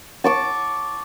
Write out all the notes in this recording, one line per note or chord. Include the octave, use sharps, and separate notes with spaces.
A5 C#6 D6